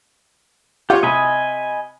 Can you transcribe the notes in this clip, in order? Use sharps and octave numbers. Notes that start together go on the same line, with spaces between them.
F4 G4 C#5 F#5
C3 D#5 G#5 B5